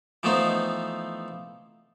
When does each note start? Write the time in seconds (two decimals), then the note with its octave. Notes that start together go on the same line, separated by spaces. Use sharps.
0.23 E3 F3 A3 B3 D#4 C5